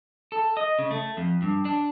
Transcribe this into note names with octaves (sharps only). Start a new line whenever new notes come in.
A4
D#5
C#3
A3
F2
G2
D4